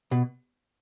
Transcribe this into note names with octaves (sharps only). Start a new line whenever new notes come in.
B2